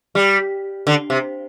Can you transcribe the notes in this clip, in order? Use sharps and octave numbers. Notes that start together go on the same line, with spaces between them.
G3
D3
C3